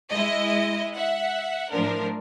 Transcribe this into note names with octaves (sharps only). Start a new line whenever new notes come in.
G#3 E4 D#5
E5 F#5
A2 F3 D4 A#4